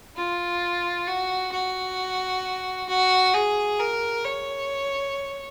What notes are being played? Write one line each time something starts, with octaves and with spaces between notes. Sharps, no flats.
F4
F#4
F#4
F#4
G#4
A#4
C#5